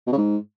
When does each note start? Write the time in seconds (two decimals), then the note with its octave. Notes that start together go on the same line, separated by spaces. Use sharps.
0.07 B2
0.12 C#3
0.18 G#2